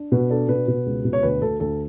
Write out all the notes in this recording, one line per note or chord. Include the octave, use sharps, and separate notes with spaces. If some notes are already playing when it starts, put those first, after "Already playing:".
Already playing: D4
B2 B4
D4 A4
B2 B4
B2
C#2
B2
C#5
D2 B4
D2 A4
D2 A4